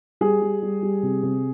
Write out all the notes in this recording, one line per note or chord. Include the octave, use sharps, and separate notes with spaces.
G3 G#4
G3
G3
G3
C3
C3